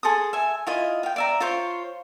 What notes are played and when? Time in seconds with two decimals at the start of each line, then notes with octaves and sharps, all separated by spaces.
0.03 G#4 A4 C6 D#6
0.33 E5 G#5
0.67 E4 F4 D#5
1.03 F5 G5
1.16 D5 E5 A#5
1.40 F4 C5 C#5 C6